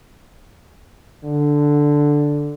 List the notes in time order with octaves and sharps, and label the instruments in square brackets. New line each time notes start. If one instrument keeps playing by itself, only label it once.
[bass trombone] D3